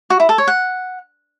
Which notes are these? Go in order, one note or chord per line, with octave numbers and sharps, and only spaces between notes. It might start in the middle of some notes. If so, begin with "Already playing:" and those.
F#4
E4
A4
C#5
F#5